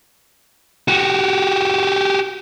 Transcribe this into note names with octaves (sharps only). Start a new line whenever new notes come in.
F#4 G4